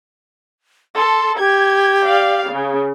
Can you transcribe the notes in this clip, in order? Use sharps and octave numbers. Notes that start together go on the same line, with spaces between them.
A4 C6
G4 G#6
D5 F5
C#3